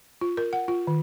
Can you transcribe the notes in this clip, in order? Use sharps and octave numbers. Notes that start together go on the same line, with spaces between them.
F4
A#4
F#5
F4
D#3